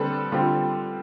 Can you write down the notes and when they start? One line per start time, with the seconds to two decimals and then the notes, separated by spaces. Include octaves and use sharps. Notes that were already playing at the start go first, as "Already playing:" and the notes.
Already playing: D3 G3 C4 A4 B4
0.32 D3 G3 C4 F4